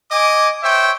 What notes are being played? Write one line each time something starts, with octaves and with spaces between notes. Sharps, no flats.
D#5 G#5 D6
C5 C#5 E5 G5